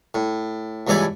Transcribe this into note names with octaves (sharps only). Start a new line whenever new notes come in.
A2
C#2 G2 E3 A4 D5 G#5